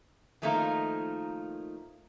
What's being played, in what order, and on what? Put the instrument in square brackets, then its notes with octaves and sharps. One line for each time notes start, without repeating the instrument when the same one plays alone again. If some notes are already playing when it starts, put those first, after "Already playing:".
[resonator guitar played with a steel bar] D#3 F3 A3 A#3 D#4 F4